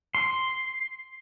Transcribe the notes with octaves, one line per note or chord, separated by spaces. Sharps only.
C6